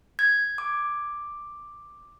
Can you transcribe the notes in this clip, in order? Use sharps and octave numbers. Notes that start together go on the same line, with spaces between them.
G#6
D6